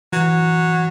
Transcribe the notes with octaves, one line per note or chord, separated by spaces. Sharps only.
E3 F#3